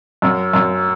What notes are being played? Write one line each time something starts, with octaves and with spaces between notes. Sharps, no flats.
F#2
F#2